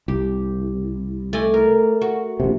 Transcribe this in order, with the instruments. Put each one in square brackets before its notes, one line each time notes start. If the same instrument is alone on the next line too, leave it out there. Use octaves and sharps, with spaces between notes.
[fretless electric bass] C2 [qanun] G4
[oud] A3 [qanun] D5 D#5 G#5
[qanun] A#4
[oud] F#4
[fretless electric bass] A#1 C3